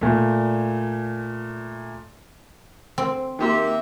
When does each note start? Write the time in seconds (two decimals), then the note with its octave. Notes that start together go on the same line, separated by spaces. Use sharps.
0.01 A#2 A3
2.98 C4
3.39 D#3 A#3 G4 E5 C6